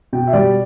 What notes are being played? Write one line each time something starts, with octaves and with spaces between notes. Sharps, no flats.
B2 G5
E5
G3 D5